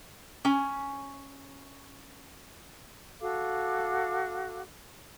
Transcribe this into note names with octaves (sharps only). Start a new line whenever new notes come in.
C#4 G#5
F#4 A4 F5 D6